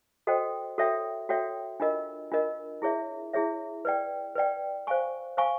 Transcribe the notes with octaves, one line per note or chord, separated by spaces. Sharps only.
F#4 A4 C5 D#5 G5
F#4 A4 C#5 E5 G5
F#4 A4 C#5 E5 G5
D4 F4 A#4 D#5
D4 F4 A#4 D#5
E4 G#4 C#5 E5
E4 G#4 C#5 E5
B4 D5 G5
B4 D5 G5
C5 F5 G#5 C#6
C5 F5 G#5 C#6